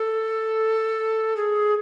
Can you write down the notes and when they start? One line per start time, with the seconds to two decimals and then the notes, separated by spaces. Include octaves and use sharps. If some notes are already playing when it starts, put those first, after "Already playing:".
Already playing: A4
1.37 G#4